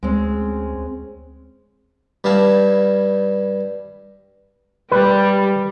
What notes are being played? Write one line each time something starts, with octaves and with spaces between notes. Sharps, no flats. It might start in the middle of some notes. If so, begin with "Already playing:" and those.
D2 G#3 C4 C#4
G2 G3 E4 F5 A5
G3 B4